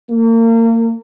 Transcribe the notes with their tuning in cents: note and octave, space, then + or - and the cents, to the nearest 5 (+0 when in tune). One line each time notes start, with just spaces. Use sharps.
A#3 -35